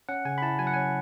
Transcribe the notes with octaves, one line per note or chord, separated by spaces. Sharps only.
C#4 F#5
C#3 G#5
B5
E4 A5
F#3 G#5
F#5
C#4 G#5